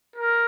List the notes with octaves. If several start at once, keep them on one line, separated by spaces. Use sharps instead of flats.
A#4